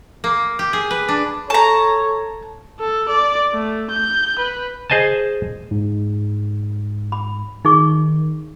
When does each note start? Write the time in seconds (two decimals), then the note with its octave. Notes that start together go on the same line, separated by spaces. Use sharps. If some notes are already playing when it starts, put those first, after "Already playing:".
0.24 A#3
0.59 G4
0.73 G#4
0.91 B4
1.08 D4
1.50 A4 C#5 A5 A#5
2.80 A4
3.09 D5
3.54 A3
3.91 G6
4.39 B4
4.90 G#4 C5 D#5 G#5 A5
5.71 G#2
7.12 B5
7.65 D#3 D#4 G#4 C#6